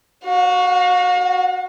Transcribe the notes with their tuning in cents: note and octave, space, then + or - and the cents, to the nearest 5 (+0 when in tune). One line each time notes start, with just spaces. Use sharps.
F#4 +0 F5 +45